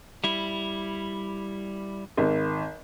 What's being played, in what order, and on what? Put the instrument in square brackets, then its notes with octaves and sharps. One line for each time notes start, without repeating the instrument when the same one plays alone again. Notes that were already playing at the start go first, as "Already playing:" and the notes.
[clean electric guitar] G3 E4
[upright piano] G#1